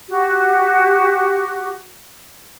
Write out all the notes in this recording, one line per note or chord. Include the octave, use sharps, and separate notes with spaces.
F#4 G4